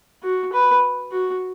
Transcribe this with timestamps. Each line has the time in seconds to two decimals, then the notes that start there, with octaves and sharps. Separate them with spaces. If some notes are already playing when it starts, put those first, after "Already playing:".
0.23 F#4
0.53 B4
1.12 F#4